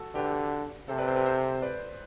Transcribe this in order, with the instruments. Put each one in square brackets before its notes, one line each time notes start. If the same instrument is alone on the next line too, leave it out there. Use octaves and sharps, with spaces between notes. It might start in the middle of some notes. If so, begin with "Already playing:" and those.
Already playing: [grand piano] F#4 A4
[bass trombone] D3 [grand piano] G4 B4
[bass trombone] C3 [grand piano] A4 C5
[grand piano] B4 D5
A4 C5
G4 B4
A4 C5
B4 D5